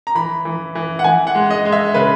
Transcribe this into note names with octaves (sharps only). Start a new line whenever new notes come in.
A#5
E3 B5
E3
E3
F#5
E3 G#5
F#5
G#3
D#5
G#3
E5
C#3 B4